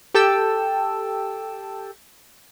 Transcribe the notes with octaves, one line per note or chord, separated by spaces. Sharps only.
G4 A4 G5 A5 E6